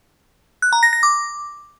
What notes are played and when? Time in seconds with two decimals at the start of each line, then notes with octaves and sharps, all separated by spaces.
0.62 F#6
0.73 A#5
0.83 A#6
0.93 A#6
1.03 D6